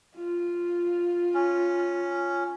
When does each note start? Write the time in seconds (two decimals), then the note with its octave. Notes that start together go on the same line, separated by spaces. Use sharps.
0.15 F4
1.34 C#4